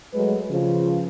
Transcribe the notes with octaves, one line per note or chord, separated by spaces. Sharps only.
F#3 G#3 A3 B4
C#3 F3